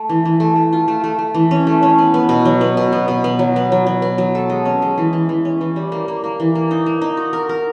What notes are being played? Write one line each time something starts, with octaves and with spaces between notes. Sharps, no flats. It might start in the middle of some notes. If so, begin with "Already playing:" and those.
Already playing: A3
E3
E3
A3
A3
F4
A3
A3
A3
E3
C#4
A3
C#4
B3
B3
B2
F#3
B3
B2
B3
B2
B3
F#3
B3
F#3
F#3
B3
F#3
A4
G#3
C#4
G#3
E3
E3
E3
C#4
E3
G3
A#3
A#3
A#3
E3
A#3
D#4
A#3
D#4
F#4
A#4
A#4